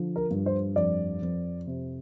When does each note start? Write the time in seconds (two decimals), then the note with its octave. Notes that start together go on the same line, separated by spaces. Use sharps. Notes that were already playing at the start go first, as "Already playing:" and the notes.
Already playing: D3 F3
0.16 A#4
0.31 G2
0.46 C5
0.76 F2 D5
1.22 F2
1.66 C3